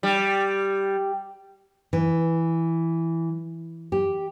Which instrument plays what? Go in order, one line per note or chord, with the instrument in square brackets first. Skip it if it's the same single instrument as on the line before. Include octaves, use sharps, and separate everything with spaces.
[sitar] G3
[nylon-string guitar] E3
G4